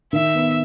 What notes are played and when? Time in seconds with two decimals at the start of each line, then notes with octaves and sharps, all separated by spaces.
0.13 D#3 E5
0.35 B3